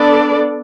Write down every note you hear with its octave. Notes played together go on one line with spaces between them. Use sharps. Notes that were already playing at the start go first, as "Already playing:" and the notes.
Already playing: B3 D4 A4 D5